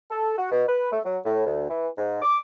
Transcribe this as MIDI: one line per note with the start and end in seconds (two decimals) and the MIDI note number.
0.10 0.35 69
0.37 0.47 66
0.51 0.62 47
0.67 0.88 71
0.91 0.99 57
1.04 1.17 54
1.24 1.45 45
1.46 1.66 38
1.69 1.87 52
1.98 2.19 44
2.22 2.38 86